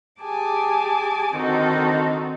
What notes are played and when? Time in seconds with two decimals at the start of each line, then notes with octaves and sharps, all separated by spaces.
0.21 G4 G#4 G#5 A5 D6
1.33 D3 D#3 C4 D#4 F#4 A4